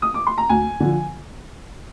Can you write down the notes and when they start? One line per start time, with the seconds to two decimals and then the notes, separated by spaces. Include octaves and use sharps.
0.02 D#6
0.14 D6
0.27 C6
0.38 A#5
0.49 D2 G#5
0.80 D3 F3